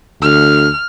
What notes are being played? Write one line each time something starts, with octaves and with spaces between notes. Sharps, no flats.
D2 F6